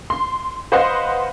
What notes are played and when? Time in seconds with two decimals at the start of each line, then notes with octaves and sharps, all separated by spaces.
0.10 C6
0.72 B4 C5 D#5 F5 F#5 C6